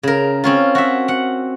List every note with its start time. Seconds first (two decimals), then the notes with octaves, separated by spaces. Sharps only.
0.03 C#3 A#4
0.44 C4 C#4 F4
0.75 F#4 E5
1.08 F#5